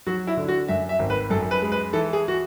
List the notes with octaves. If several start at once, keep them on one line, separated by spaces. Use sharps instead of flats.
F#3 F#4
E4
D3
F#4
F#2 E5
E5
G#1
B4
F#2 A4
B4
G#3
B4
E3 A4
G#4
F#4